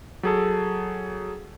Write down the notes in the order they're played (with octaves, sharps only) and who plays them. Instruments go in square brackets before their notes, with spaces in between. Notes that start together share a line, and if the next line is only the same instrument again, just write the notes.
[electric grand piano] F#3 G#4 A4